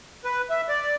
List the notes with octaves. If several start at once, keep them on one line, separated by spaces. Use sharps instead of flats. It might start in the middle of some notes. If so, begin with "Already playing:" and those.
B4
E5
D5